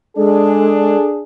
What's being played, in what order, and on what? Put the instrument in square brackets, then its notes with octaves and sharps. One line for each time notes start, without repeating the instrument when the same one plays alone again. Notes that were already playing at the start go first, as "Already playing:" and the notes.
[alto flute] G#3 [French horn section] D4 G#4 [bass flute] A4